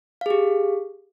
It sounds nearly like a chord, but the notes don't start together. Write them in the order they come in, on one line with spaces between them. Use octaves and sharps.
F5 G#4 G4